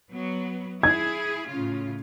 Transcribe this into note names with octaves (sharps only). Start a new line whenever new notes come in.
F#3 B3
E4 G#4 G#6
A2 C#3 F4